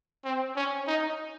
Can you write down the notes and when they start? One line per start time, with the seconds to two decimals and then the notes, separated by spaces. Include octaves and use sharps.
0.25 C4
0.56 C#4
0.87 D#4